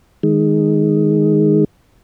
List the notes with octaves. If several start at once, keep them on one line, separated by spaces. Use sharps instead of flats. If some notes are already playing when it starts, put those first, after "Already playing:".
D#3 G#3